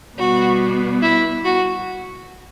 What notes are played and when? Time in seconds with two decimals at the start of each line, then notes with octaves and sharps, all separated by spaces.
0.17 B2 G3 B3 F#4
1.02 E4
1.44 F#4